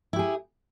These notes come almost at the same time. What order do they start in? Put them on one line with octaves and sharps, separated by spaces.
E4 G4 G#4